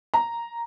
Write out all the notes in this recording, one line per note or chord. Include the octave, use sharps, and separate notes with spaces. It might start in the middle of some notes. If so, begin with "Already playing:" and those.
A#5